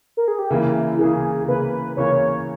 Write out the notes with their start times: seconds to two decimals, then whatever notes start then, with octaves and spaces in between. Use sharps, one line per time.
0.17 A#4
0.28 G#4
0.39 G4
0.50 C#3 E3 A#3 E4
0.99 C#3 E3 A#3 G#4
1.48 C#3 E3 A#3 B4
1.97 C#3 E3 A#3 C#5